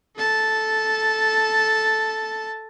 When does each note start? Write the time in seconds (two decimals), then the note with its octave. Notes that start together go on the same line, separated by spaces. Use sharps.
0.17 A4 A5